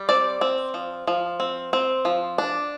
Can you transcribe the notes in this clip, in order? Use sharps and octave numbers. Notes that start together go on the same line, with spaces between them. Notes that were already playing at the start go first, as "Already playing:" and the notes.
Already playing: G3
C4 D5
C4
F3
F3
C4
C4
F3
D4